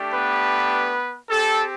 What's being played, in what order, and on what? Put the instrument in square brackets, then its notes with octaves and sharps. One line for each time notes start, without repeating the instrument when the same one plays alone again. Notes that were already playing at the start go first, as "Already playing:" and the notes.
Already playing: [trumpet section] A3 D4 G4
B3 B4
C4 G4 A4